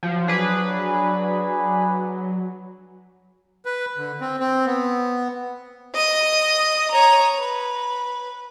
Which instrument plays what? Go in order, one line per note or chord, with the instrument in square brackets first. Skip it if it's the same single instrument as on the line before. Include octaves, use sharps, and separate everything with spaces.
[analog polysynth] F3 [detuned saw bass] F#3
[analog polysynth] D4 G#4 B4
[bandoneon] B4
D3
C4
C4
B3
[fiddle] D#5 D#6
C#5 A#5
B4